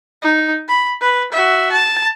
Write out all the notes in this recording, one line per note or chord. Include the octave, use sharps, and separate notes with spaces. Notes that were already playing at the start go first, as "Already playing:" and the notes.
D#4
B5
B4
F#4 E5
A5